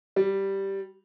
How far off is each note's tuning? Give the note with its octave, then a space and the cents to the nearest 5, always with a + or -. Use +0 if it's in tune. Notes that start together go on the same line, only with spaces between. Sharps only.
G3 -5